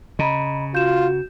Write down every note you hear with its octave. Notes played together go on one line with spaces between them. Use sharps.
C#3 D#5 A#5 B5
F4 F#4 G6 E7